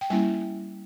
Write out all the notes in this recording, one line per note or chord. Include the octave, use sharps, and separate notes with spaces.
G5
G3 A#3 C#4 E4 G#5